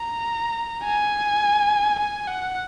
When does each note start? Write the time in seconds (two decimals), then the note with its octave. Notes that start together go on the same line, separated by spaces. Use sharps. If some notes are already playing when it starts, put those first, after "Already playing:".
Already playing: A#5
0.84 G#5
1.99 G#5
2.28 F#5